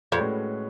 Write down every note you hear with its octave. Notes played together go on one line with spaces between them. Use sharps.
F2
A2 G#3 C#4 F#4 B4